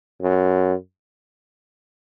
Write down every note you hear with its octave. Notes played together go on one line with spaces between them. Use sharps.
F#2